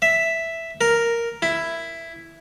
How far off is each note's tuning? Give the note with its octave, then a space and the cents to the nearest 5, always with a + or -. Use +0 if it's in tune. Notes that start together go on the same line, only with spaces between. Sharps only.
E5 +0
A#4 +0
E4 +5